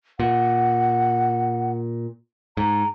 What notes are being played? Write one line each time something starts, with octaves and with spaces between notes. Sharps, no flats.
A#2 F#5
G#2 A#5